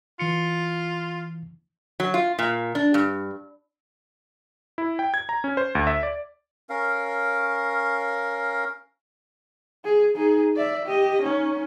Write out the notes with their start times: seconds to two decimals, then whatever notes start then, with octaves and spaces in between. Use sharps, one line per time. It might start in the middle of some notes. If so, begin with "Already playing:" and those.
0.19 E3 F4 C#7
2.00 F#3
2.14 F4
2.39 A#2
2.75 D4
2.94 G2
4.78 E4
4.99 G5
5.14 G#6
5.29 A#5
5.44 C#4
5.57 C5
5.75 D2
5.87 E5
6.03 D5
6.70 C#4 A#4 F5
9.85 G#4
10.15 D#4 G#4
10.56 D5 E5
10.86 G4 D#5
11.22 C#4 D#4